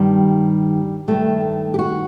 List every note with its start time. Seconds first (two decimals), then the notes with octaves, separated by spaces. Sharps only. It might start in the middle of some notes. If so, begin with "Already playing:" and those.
Already playing: G2 D#3 G3
1.08 G2 D#3 A3
1.74 G4
1.79 F#4